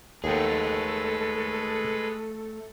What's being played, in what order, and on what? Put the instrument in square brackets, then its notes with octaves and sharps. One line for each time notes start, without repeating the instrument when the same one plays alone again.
[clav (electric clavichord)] D#2 F#5 G5 [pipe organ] G#3 B4 [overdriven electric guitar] A3 G#4 [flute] A4